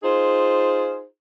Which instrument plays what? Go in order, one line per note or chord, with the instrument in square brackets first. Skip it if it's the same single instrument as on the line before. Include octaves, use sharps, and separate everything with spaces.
[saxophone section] D#4 F4 G#4 C5